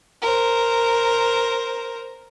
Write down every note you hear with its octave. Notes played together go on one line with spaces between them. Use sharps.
A#4 C5